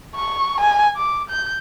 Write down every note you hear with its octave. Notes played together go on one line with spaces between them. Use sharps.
C#6
G#5
D6
G6